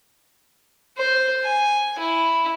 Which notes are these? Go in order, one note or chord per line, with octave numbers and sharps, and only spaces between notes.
C5
G#5
E4